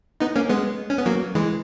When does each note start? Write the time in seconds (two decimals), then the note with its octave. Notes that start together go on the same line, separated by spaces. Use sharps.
0.20 B3 D#4
0.36 A#3 C#4
0.49 G#3 B3
0.90 C#4
0.98 B3
1.06 F#3 A#3
1.35 E3 G#3